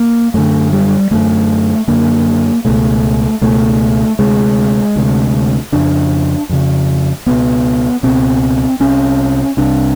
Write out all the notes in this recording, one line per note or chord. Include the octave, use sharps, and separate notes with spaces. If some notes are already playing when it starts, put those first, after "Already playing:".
Already playing: A#3
F#2 D3 A3
G3
F#2 D3 A3
F#2 D3 A#3
C#2 B2 A3
C#2 B2 A3
D2 C3 G#3
D2 C3
F2 C#3 D4
F2 C#3
C#2 B2 B3
C#2 B2 C4
C2 C3 C#4
C2 C3 D4